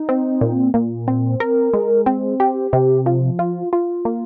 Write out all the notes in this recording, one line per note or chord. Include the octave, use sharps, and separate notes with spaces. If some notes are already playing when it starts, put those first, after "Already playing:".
Already playing: D#4
C4
A#2
A#2
C4
A#4
G#3
C4
G4
C3
F3
F4
F4
A#3